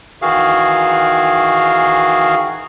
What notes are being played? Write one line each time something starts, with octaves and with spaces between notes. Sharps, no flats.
D#3 E3 F#4 G#4 F5